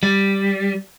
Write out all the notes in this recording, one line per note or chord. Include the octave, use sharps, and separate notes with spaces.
G3